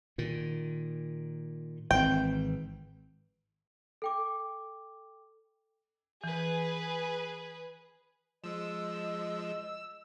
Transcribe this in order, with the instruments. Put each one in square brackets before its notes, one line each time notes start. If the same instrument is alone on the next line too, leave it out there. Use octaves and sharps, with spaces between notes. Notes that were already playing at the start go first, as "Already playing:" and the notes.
[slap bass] A#2 D#3
[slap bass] G#1 E3 C4 [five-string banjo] G5
[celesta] A4 G5 D6
[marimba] E3 [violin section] G#4 B4
[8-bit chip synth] F3 G#3 [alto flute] D#5 [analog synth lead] E6